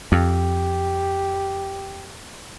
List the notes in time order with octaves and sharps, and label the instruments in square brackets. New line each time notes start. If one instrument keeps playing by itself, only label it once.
[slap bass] F2 [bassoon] G4